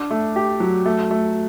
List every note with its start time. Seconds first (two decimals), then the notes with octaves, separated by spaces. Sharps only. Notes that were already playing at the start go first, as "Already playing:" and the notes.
Already playing: D4
0.11 A3
0.36 G4
0.60 F#3
0.86 A3
1.11 A3